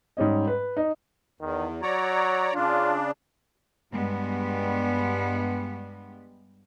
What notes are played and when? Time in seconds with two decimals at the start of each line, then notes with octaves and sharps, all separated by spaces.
0.17 G#2 G3 C#4 D#5
0.47 B4
0.77 D#4
1.41 E2 D#3
1.82 F#3 C#5 D5 A#5
2.54 C#3 D4 F4
3.92 G2 G3 G#3 B3